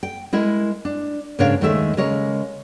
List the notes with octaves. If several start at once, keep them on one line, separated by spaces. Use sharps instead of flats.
G5
G#3 E4 A#4
D4
G#2 C#3 D4 A#4 C#5 F5
D#2 D#3 G#3 A3 A4 E5
C#3 G#3 A#4 C#5